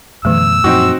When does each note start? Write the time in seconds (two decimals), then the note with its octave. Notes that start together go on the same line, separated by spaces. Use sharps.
0.25 F#2 B2 D3 E3 A3 E6
0.64 F#2 A#2 F3 C4 D#4 F#4